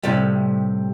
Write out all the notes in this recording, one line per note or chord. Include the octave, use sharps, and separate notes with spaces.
A2 C3 G3